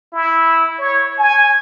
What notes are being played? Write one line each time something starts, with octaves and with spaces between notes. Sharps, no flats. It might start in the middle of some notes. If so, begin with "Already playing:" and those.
E4
C#5
G#5